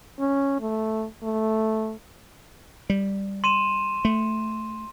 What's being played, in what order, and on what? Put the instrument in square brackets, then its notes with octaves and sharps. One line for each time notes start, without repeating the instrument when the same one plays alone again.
[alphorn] C#4
A3
A3
[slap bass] G3
[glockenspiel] C6 D#7 E7
[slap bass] A3